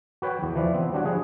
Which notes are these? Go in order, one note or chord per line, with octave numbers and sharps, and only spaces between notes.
F#4 B4 C#5 G5
E2
E3 F3 D5
B3 C4
G3 D4 F#4 C#5
F3 G#4 F#5